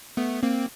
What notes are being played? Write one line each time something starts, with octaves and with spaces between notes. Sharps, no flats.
A3 B3
A#3 C4